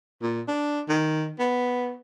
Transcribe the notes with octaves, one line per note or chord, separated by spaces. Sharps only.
A#2
D4
D#3
B3